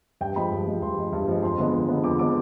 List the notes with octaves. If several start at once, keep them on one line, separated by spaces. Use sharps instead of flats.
G2 G5
F3 G#3 B5
G2
F3 G#3
G2 C6
F3 G#3
G2
F3 G#3
F2 C6
D3 G#3 B3
F2
D3 G#3 B3
F2 D6
D3 G#3 B3 D6